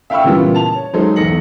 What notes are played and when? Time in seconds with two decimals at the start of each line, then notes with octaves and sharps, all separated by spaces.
0.10 E5 F5 G5 B5 C#6 E6
0.24 A#2 C#3 E3 G3 B3 F4
0.55 A5 F7
0.75 C#5
0.93 F#3 G#3 D#4 A4 C5
1.16 B1 E2 A#6 C#7 F#7